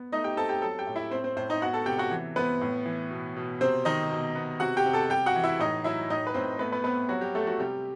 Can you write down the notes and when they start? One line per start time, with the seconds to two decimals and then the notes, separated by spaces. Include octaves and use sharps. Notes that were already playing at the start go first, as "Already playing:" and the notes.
Already playing: B3
0.12 A3 D#4 D#5
0.24 G4 G5
0.37 C4 A4 A5
0.49 G4 G5
0.62 F#3 A4 A5
0.79 G4 G5
0.87 A2
0.96 E4 E5
1.11 A2 C4 C5
1.24 C4 C5
1.36 A2 C4 C5
1.50 D#4 D#5
1.61 B3 F#4 F#5
1.73 A4 A5
1.86 C3 G4 G5
1.99 F#4 F#5
2.11 E3
2.36 B3 C4 B4
2.61 A2
2.86 E3
3.11 B2
3.37 B2
3.61 C3 C4 C5
3.85 D#3 D#4 D#5
4.10 B2
4.35 B3
4.60 C3 F#4 F#5
4.77 G4 G5
4.86 C3
4.93 A4 A5
5.10 G3 G4 G5
5.26 F#4 F#5
5.36 E3
5.44 E4 E5
5.59 A2 D#4 D#5
5.84 F#3 E4 E5
6.10 A2 D#4 D#5
6.27 B4
6.34 A2 C4 C5
6.59 A3 B3 B4
6.72 B3 B4
6.84 B3 C4 B4
7.09 F#3 G3 F#4
7.21 G3 G4
7.34 G3 A3 A4
7.47 F#3 F#4
7.59 C3 G3 G4